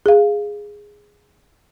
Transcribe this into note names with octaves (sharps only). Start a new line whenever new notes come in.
G#4 F5